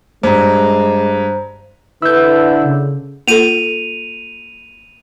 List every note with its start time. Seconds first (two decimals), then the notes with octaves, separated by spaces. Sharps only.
0.23 G2 G#3 C5 A#5
2.02 D3 E4 B4 E6 G6
2.63 C#3
3.28 A#3 F4 A4 D#7 F7